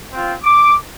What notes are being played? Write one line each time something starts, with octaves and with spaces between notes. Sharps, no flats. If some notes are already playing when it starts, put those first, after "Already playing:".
C4 F4
D6